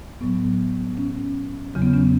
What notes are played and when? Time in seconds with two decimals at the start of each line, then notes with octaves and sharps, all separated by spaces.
0.21 A2 F#3 B3
0.98 C#4
1.74 E2 C#3 F#3
1.82 B3
1.93 C#4